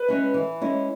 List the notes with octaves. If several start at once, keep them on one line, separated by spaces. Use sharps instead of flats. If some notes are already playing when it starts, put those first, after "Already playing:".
Already playing: B4
G#3 C#4 E4
E3
G#3 C#4 E4